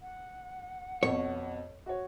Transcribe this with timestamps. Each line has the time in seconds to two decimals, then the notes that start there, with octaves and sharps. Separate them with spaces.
0.01 F#5
1.03 F2 B2 C#5
1.86 F#4 C#5